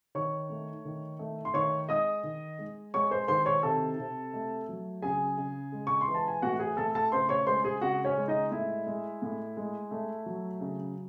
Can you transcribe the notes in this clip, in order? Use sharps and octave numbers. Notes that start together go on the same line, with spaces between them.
D#3 C#5 C#6
A3
D#3
A3
C6
D#3 C#5 C#6
G#3 D#5 D#6
D#3
G#3
G#3 C#5 C#6
C5 C6
D#3 C5 C6
C#5 C#6
C3 A4 A5
C3
A3
F#3
C#3 G#4 G#5
C#3
G#3
C#6
C6
E3
A5
G#5
A2 F#4 F#5
G#4 G#5
A2 A4 A5
A4 A5
C#3 C5 C6
C#5 C#6
G#3 C5 C6
G#4 G#5
C#3 F#4 F#5
C#4 C#5
G#3
D#4 D#5
A2 E4 E5
G#3
A2
G#3
A3
F#3
C#3